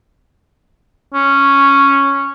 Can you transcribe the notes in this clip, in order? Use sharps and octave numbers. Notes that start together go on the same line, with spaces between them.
C#4